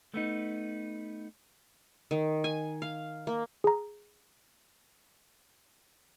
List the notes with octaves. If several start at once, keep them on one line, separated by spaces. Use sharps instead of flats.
A3 B3 D#4
D#3
G#5
F5
A#3
G#4 A#5